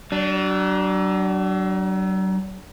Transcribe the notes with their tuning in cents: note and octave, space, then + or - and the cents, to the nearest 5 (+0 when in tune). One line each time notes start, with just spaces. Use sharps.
F#3 +40 D4 +0